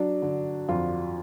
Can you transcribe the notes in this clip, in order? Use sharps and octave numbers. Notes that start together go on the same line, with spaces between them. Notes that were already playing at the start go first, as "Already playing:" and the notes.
Already playing: F#3 D4
D3
F2 F4